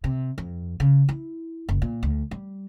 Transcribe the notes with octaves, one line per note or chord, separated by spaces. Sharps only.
C3
F2
C#3
E4
F#1
A#2
D2
G3